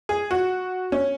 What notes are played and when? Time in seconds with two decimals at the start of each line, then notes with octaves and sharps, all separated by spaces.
0.09 G#4
0.31 F#4
0.92 C#4